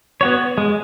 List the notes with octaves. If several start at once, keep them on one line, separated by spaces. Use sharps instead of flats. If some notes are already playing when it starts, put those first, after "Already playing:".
B3 F#4 C#5
G#3